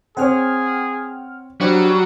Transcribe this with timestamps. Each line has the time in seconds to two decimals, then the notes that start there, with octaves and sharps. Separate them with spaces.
0.17 C4 G#4 C#5 F#5 G5 F6
1.61 F#3 G3 D4 C5 C#5